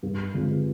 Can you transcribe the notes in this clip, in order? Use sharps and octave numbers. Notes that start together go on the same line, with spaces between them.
G2
D3 G#3 C4 F4